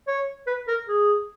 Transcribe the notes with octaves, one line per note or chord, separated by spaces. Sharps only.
C#5
B4
A#4
G#4